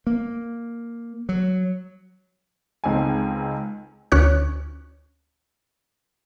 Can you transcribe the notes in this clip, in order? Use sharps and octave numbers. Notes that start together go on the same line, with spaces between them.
A#3
F#3
C#2 C4 D#4 A4 G#5
D2 C#4 C#5 F#6